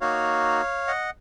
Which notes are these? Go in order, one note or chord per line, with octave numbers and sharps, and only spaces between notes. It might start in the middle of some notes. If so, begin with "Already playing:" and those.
A#3 D#4 F#4 C#5 F5
D#5 F#5